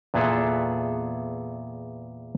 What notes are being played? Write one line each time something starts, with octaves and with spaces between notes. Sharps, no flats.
E2 A#2 B3 E4 G#4 A4